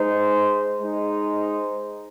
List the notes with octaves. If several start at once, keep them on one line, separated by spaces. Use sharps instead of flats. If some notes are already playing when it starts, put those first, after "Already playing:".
Already playing: G#3 D#4 C5
G#3 D#4 C5